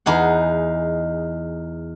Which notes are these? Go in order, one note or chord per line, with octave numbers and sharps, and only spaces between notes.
E2 D#4 G#4 F#5